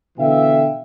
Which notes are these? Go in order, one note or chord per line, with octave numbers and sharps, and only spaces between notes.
B2 D3 E3 E5 F5 G5